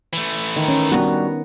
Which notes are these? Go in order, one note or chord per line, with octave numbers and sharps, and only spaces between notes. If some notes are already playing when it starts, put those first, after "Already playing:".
E3 A3
D#3
C#4
G3 B3 D4 F#4 A#5